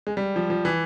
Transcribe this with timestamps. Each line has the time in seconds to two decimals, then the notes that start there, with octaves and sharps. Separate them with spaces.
0.07 G#3
0.17 G3
0.36 F3
0.50 F3
0.65 E3